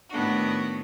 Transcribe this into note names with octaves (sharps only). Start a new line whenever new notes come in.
A2 D#3 B3 D4 F#4